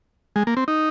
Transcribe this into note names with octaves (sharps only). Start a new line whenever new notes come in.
G#3
A#3
C4
D#4